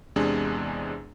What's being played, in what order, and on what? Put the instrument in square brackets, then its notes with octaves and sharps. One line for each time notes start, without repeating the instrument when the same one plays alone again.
[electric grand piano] E2 C3 G#3 D4 G#4